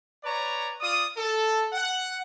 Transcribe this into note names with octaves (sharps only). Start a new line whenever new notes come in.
B4 C#5 D5 A#5
F4 D5 D#6
A4
F#5